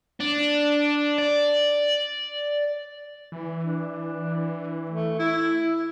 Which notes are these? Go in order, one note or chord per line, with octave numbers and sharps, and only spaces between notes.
D4
D5
E3
D4
A3
E4